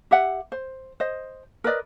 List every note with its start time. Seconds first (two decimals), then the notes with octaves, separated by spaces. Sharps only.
0.11 G4 E5 F#5
0.52 C5
1.00 C5 D#5
1.64 A#4 B4 D5 D#5